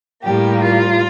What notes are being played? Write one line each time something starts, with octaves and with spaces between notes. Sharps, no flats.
A2 G3 A#3 G4
F4